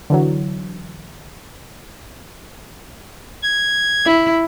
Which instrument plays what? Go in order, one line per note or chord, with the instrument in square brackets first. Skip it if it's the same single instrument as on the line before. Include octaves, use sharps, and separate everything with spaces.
[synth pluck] D3 E3 F#3
[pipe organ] G#6
[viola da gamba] E4